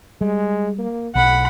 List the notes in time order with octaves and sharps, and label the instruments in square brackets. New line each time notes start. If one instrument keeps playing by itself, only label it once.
[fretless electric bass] G3 [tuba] G#3
[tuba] A#3
[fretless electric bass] B1 [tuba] A2 [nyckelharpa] F#5 B5